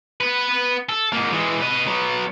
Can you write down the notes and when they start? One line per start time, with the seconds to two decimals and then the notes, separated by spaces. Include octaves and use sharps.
0.21 B3 B4
0.89 A4
1.13 G#2 A#3
1.32 E3 G#3
1.61 B4 D#5
1.87 F#3 B3